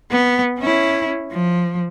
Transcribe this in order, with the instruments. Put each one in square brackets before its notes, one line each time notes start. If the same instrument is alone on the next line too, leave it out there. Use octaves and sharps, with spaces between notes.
[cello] B3
C#4 E4
F3